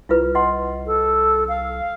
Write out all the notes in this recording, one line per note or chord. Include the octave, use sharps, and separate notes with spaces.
C2 E4 F4 B4
D#5 F#5 C6
A4
F5